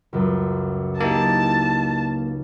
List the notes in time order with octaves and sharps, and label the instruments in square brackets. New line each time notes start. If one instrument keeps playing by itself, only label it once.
[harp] C#2 F#2
[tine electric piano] A#3 [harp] D#4 E4 G4 [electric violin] A5